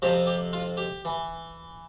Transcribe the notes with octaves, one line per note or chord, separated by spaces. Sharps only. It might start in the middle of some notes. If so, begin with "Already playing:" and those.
F2 C3 F3 G4
G4
F4
G4
E3